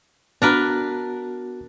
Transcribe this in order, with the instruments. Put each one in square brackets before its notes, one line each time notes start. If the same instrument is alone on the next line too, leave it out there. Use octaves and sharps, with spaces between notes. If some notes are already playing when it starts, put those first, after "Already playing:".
[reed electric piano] B3 F#4 [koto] D4 A#4 B4